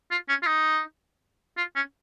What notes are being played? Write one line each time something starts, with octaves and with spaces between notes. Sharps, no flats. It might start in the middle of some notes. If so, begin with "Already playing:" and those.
F4
C#4
F4
D#4
F4
C#4